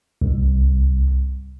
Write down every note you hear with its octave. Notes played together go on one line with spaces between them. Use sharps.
C2